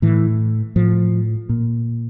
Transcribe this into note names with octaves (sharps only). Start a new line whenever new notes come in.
A2 E3
A2 F3
A#2